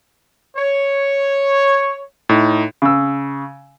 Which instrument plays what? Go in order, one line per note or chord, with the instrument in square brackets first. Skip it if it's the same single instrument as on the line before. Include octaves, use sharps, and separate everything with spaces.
[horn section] C#5
[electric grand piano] A2 D#4
[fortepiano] C#3 E6